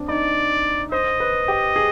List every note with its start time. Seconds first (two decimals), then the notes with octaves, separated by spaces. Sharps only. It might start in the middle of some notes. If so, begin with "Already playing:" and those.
Already playing: C4 D4
0.08 D#4 D5
0.92 C5 D#5
1.20 B4
1.48 G4
1.76 G#4